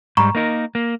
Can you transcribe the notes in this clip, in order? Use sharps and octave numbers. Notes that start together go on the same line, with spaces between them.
G#2 G3 A#5 B5 C#6
A#3 D#4 A#4
A#3